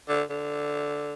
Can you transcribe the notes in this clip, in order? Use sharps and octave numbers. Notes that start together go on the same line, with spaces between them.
D3
D3